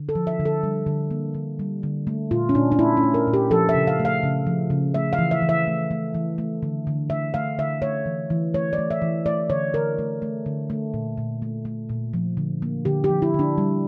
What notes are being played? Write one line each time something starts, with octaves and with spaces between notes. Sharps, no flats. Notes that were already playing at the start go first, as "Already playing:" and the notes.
Already playing: D3
A4
F3
E5
D3
A4
G3
D3
A#3
D3
G3
D3
A3
A#2 F4
C#4
A#2 D4
D4
A3 E4
C#4
A3
A#4
A#2
G4
F3 A4
E5
C#3
F5
A3
F5
C#3
F3
C#3
A3 E5
F5
E3
E5
E3
E5
A3
A3
E3
A3
D3
D3
A3 E5
A3 F5
D3 E5
A3 C#5
E3
E3
A3 C#5
D5
A3
E5
E3
A3 D5
D3 C#5
D3 A#4
A3
A3
D3
A3
A#2
A#2
A3
A3
A#2
F3
D3
A#3
D3 G4
G4
F3
E4
D3
D4
G3